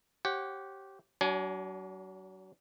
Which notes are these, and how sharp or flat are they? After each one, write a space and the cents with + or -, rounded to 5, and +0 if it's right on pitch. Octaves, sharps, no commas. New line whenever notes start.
G4 -15 C#5 -40 F#5 +0
F#3 +30 D4 -30 G#5 +20